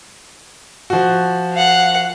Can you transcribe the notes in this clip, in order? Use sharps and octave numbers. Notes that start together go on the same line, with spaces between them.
F3 F#4
F5 F#5